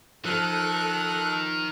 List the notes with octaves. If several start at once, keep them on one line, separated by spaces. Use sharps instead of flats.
D#3 F3 A4 F#6